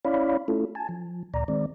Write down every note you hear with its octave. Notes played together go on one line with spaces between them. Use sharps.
C#4 E4 C#5 D5 F5 B5
A3 C#4 E4 F4 A4
G#5 A5
F3
D2 A#2 D5 A#5
D#3 G#3 C4 D5